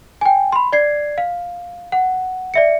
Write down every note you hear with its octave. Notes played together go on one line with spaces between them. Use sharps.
G5 G#5
B5 C6
D5 G#6 C7
F5
F#5
D5 E5 C#7